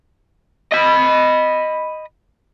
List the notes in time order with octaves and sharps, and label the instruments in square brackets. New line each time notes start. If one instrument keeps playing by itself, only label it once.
[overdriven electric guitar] D#5 B5